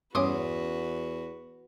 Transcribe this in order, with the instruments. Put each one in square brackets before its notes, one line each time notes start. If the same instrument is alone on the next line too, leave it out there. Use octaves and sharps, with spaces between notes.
[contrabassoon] E2 [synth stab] G2 C#4 [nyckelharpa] F#4 B4 [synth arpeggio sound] C6 D6 D#6